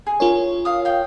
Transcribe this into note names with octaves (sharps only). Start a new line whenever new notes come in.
G#4
F4 A#4 C#5
F5 D#6
F5 G5